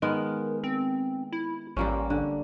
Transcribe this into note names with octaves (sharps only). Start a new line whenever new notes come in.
D#3 G#3 B3 A#4
C4
E4
A1 G3 A#3 C#4
D3